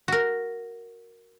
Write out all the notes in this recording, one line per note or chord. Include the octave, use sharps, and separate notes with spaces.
F#4 A#4